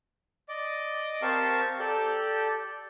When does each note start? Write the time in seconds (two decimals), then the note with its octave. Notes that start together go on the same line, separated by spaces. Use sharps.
0.49 D5 D#5 D6
1.22 C4 G4 A#4 F5 A5 C#6
1.80 G4 A4 D5 G6